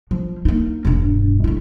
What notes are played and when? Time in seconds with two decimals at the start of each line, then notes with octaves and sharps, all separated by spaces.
0.11 F3
0.45 A#3 D#4
0.85 E1 G2
1.44 A3 E4